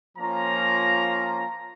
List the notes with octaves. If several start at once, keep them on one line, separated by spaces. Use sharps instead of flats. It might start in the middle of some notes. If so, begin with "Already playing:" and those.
F3 A#3 C#4 F4 A#5